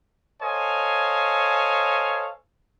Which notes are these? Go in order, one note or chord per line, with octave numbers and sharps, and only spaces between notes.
A4 C5 C#5 D#5 F5 G#5